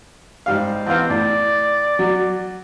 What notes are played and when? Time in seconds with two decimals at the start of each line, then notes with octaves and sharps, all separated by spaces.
0.46 G#2 G3 F5
0.87 E2 C4 F5
1.10 A2 D5
1.99 F#3